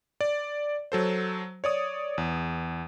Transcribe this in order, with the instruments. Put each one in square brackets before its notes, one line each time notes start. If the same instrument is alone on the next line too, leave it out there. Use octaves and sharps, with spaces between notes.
[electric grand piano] D5
F#3 A4 C5
C#5 D5 D#6
E2